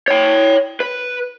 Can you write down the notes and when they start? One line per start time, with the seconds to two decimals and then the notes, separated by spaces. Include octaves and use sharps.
0.08 C#5 G5
0.80 B4